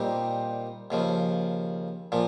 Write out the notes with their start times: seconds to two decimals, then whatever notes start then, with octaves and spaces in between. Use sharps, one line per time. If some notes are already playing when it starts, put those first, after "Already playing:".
Already playing: A#2 G3 C4 D#4 G4
0.91 D#2 C#3 F3
2.12 A#2 F3